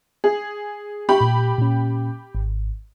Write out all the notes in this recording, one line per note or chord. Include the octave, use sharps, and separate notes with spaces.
G#4
G4 B5 C#6
A#2
A#2 C#4
G#1